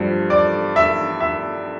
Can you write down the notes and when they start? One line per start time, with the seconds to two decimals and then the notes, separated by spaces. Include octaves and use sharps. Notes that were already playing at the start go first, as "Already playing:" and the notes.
Already playing: G2 F3 A3
0.30 D5
0.76 E5
1.20 E5